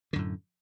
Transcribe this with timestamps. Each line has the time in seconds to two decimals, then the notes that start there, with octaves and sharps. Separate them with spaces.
0.13 D3
0.16 F#2
0.18 A2